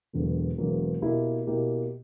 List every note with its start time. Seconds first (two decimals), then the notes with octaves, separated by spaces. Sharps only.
0.13 E1 E2 D3 F#3 A#3
0.58 E1 E2 D3 F#3 A#3
1.02 B2 A#3 E4 G4
1.47 B2 A#3 E4 G4